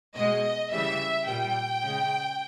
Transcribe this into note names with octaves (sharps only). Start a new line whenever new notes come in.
B2 G#3 D#5
C#3 E3 G3 E5
A#2 G3 G5
C#3 G#3